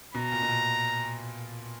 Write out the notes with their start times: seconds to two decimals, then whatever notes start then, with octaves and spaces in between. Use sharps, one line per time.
0.14 B2 A#5
0.32 A#2
0.42 B2
0.48 A#2